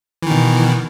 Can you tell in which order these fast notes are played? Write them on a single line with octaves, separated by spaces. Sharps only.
E3 D#3 B2